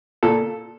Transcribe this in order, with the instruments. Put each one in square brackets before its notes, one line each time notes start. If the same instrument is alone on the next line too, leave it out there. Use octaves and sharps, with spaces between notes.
[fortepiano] A#2 A4